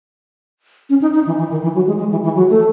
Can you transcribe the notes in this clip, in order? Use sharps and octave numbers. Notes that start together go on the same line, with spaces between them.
C#4
D#4
D#4
E3
E3
D#3
E3
F#3
G#3
G#3
E3
E3
F#3
A3